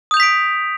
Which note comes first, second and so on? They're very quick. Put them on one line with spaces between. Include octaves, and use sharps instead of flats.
D#6 G6 F7 B6 D7